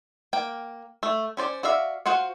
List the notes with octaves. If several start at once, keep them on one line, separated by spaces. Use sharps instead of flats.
A#3 G5
A3
C#4 C5 D5
F#4 D5 E5 F5
F4 F#4 C5 F#5